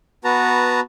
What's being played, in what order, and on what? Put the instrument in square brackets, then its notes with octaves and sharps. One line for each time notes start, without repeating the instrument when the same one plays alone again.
[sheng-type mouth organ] B3 F#4 B4 A5 A#5